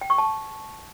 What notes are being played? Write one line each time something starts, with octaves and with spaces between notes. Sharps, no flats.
G5
C#6
A5